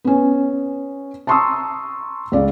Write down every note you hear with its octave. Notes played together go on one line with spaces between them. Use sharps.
B3 C#4
A5 A#5 C6 C#6 D#6 E6
C#2 D5 F5